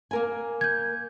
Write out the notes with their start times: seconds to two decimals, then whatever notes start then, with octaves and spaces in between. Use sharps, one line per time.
0.11 A#3 A#4 G#5
0.61 G6 G#6